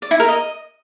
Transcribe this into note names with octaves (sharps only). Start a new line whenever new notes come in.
D5
E4
A#4
D#5